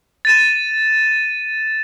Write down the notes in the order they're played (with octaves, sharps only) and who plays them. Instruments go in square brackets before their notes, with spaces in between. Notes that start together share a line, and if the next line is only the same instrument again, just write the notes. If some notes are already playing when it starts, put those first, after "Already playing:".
[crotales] A6 D#7 E7